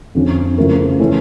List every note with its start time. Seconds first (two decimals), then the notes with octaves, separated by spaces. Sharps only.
0.15 F2 D3 F3 C#4
0.58 C#3 F3 A3 E4 A#4
1.00 E3 A3 C#4 E4